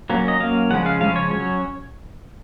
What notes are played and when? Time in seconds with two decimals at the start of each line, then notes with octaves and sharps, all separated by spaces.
0.10 F#3 A#3 C#4
0.28 D#5
0.40 F#3 A#3 C#4 F5
0.70 C#3 F3 G#3 C#4 F#5
0.86 F5
1.01 C#3 F3 G#3 C#4 F5
1.16 C#5
1.31 F#3 C#4 C#5